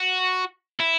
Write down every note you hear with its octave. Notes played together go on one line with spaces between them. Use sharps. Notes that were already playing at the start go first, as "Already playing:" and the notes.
Already playing: F#4
E4